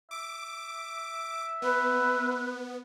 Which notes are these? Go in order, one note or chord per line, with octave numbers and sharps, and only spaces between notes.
E5 D6
B3 B4